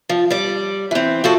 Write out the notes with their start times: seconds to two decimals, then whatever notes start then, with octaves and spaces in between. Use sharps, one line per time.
0.09 F3
0.30 G3 D5
0.91 E3 C4
1.24 F3 F#4 A4